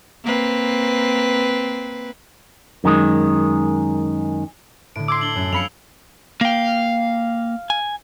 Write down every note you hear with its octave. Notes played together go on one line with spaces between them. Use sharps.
A#3 C4 B4
F#2 D#3 G#3
A2 D3 D7
C6 D6 E6 G#6 C7
D4 F#7 G7
F#2 G#6
F2 F5 B5 C#7 F7
A#3 F5 G5
G#5